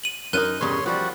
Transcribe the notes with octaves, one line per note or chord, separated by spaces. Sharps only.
D#7 F#7
F#2 D4 D#4 A#4 F#6 D#7
E2 G2 C#3 C#5 C6
F3 G3 F#4 F#5